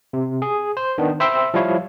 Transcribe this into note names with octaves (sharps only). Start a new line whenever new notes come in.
C3
G#4
C5
D#3 B3 D4
C5 E5 G5 B5 C6 E6
F3 G3 E4 C#5 F5